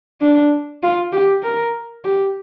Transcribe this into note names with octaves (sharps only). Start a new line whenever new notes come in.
D4
F4
G4
A#4
G4